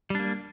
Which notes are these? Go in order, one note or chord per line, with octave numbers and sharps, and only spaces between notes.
G3 A#3 D4